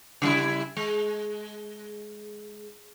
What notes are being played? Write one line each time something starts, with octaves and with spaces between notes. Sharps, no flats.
C#3 G3 E4
G#3